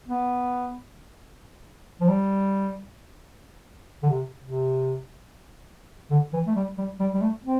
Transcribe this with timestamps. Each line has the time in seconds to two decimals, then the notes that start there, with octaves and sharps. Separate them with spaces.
0.08 B3
2.01 F3
2.09 G3
4.03 D3
4.10 C3
4.43 C3
6.11 D3
6.33 E3
6.47 A3
6.55 G3
6.78 G3
7.00 G3
7.14 G3
7.22 A3
7.44 C4